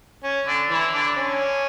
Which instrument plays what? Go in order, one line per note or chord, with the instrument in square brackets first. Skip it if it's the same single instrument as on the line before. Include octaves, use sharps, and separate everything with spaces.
[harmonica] C#4
D3 D4
E3 E4
D3 D4
C#4